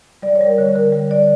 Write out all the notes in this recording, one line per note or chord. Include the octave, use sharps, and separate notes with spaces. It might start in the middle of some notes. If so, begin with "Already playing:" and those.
G3 D5
C#5
G3
A#4
D3 C#5
D3 A#4
G3
D3 D5